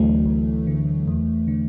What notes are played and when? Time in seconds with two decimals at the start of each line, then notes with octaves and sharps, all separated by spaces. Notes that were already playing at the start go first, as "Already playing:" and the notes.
Already playing: D2 D3 E3 F#3 A3
0.26 D2
0.67 D3
1.08 E2
1.48 D3